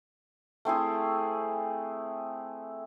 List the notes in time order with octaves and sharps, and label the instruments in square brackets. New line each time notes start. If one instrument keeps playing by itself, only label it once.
[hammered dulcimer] A3 C4 E4 G#4